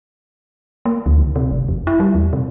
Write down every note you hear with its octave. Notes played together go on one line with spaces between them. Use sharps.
A#3
D2
C#2
C3
G1
F2
E4
G3
E2
C3